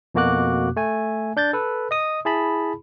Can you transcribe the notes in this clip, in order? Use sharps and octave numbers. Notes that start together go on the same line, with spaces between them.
F2 B2 A#3 F#4 D6 F#6
A3 G#5
D4 G6 A6
A4 B4
D#5 D#6
E4 G#4 A5 B5